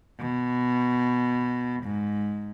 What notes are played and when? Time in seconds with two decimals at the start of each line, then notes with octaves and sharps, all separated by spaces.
0.19 B2
1.83 G#2